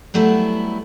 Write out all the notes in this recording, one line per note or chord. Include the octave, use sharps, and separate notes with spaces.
F#3 G3 A3 B3 E4